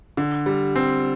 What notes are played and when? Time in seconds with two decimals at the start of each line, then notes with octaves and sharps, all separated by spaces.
0.17 D3
0.46 G3
0.76 C4